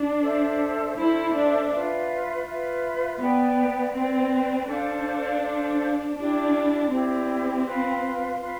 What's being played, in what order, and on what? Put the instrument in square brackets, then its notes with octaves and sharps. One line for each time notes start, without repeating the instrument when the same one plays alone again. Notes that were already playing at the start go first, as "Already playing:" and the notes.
Already playing: [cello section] D4
[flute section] A4 C5 E5
[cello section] E4 [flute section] A4 C5 E5
[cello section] D4
[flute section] F4 B4 E5
F4 B4 E5
[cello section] B3 [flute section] B4 D5 G5
[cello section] C4 [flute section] B4 D5 G5
[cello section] D4 [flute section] A4 C5 F5
[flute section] A4 C5 F5
[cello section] D4 [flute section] E4 G4 D5
[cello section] C4 [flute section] E4 G4 D5
[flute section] F4 B4 F5 C6
F4 B4 F5 C6